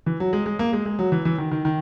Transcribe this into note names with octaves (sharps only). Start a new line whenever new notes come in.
E3
F#3
G#3
G#3
A#3
G#3
G#3
F#3
E3
E3
D#3
D#3
D#3